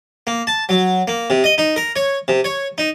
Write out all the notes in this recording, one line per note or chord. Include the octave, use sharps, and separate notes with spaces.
A#3
A5
F#3
A#3
C3
D#5
D#4
A#4
C#5
C3
C#5
D#4